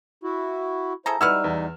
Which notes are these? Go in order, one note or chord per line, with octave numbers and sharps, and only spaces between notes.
E4 F#4
E4 G#4 A4 C5 A#5
G3 D#4 E4 F#4 B4 E6 F6
E2